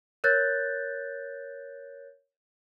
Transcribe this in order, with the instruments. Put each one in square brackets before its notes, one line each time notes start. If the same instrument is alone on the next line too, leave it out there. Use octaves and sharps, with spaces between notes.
[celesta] A#4 C#5 F#6 G6 A6